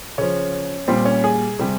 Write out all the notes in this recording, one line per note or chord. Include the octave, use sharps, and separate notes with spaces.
C#3 F3 C#4
A#2 G3 C4
C#4
G#4
C3 G3